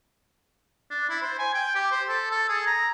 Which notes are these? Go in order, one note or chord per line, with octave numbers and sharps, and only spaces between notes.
D4
E4
C5
G#5
G5
G4
C5
A4
A4
G#4
A#5